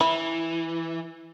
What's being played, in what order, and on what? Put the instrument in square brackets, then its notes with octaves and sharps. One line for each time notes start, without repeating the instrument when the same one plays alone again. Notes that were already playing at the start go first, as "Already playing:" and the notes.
[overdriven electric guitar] E3 [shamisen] E4